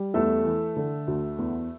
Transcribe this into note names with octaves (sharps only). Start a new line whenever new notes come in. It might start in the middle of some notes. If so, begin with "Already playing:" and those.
Already playing: G3
E2 A3 A4
E3
D3
D2
E2